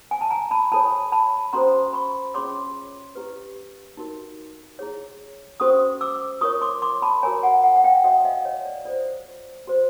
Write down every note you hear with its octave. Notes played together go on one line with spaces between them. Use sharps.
G#5
A5
G#5 A#5
A5 B5
E4 A4 C#5 A5 B5
A5 B5
C#4 F#4 A4 C5 A#5 C6
B5 C#6
C#4 F4 G#4 C#5 C6 D6
E4 G4 B4
D#4 F#4 A#4
E4 G#4 C#5
C#4 F#4 A4 C5 C#6 D#6
D6 E6
F4 A#4 C#5 C#6 D#6
C6 D6
C6 D6
A5 B5
F#4 A#4 C#5 G#5 A#5
F#5 G#5
F#5 G#5
F#5
F5 G5
F#4 A4 C#5 E5 F#5
D#5 F5
C#5 D#5
D5
F4 A4 C5 D5
F#4 A4 C5